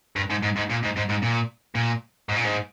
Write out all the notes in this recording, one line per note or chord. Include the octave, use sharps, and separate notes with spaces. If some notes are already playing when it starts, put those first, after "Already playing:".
G2
G#2
G#2
G#2
A#2
G#2
G#2
G#2
A#2
A#2
G#2
A#2
G#2